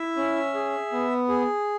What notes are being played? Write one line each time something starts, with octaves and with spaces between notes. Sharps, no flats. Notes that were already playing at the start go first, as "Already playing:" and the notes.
Already playing: E4 E5
C#4
G#4
B3
G#4